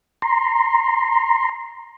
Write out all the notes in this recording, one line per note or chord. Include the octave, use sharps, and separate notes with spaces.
A#5 C6